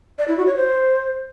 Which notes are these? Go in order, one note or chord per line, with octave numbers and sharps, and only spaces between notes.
D5
E4
F#4
C#5
C5